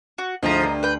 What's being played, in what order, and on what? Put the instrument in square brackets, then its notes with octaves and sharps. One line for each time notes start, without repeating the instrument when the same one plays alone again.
[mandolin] F#4
[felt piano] D2 [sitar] G#2 F3 [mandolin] D#5 A#5
[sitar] G2
[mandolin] B4 G5